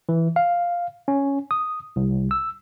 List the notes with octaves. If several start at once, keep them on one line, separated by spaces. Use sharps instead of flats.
E3
F5
C#4
D#6
C2
E6